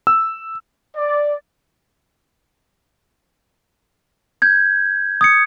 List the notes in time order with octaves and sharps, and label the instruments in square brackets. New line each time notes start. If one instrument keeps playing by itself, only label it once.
[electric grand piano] E6
[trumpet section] D5
[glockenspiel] G6 G#6
D#6 G#6 C#7